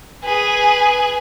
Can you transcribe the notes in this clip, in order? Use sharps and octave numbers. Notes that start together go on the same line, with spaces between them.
G#4 B4